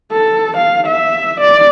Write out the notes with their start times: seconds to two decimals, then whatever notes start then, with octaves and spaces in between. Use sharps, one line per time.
0.12 A4
0.57 F5
0.87 E5
1.40 D5